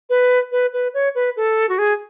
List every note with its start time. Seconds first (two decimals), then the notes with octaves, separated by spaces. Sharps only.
0.10 B4
0.52 B4
0.73 B4
0.94 C#5
1.15 B4
1.37 A4
1.69 F#4
1.79 G#4